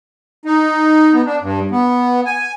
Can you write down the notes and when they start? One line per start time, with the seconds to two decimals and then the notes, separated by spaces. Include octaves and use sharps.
0.45 D#4
1.13 B3
1.26 D4
1.42 G2
1.71 B3
2.26 G#5